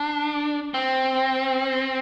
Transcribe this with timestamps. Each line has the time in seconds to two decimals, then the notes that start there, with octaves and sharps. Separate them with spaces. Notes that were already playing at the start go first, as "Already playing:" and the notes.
Already playing: D4
0.74 C4